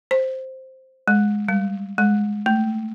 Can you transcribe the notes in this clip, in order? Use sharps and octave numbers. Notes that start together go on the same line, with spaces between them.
C5
G#3
G3
G#3
A3